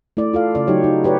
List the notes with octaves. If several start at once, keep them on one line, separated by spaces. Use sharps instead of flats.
A3 E4 D5
F4 A4 F5
C#3 D5
F#3 D#4 G4 C#5
D#4
G4 B4 C#5 D5